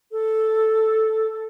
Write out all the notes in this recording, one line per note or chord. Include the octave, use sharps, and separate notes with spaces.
A4